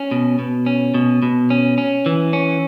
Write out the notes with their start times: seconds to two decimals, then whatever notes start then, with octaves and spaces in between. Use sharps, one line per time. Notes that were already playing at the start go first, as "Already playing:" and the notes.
Already playing: C#4
0.11 B2
0.39 B2
0.66 C#4
0.94 B2
1.22 B2
1.50 C#4
1.78 C#4
2.06 E3
2.33 C#4